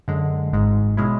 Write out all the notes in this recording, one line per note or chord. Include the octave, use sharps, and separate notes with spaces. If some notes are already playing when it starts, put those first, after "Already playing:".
F#2 D3 G#3
G#1 G#2 G#3
B2 G#3 C#4 E4